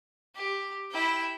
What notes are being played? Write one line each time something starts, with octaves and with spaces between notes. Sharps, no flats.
G4
E4 G5